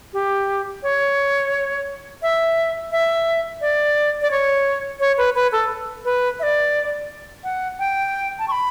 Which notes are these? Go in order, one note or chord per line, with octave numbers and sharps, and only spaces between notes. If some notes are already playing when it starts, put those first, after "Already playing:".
G4
C#5
E5
E5
D5
D5
C#5
C#5
B4
B4
A4
B4
E5
D5
F#5
G5
A5
C#6
B5